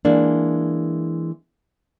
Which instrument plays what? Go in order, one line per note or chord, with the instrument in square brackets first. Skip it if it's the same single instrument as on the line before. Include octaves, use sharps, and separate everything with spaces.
[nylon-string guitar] E3 G#3 A#3 D4